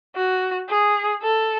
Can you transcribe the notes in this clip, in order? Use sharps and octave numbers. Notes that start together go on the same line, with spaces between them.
F#4
G#4
A4